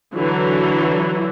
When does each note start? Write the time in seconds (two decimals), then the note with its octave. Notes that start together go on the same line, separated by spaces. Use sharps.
0.15 D3 E3 F#3